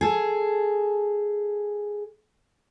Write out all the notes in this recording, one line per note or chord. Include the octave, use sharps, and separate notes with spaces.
G#4 A4